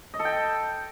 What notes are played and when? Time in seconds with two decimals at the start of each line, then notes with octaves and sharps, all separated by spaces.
0.14 D#5
0.19 A4
0.25 G5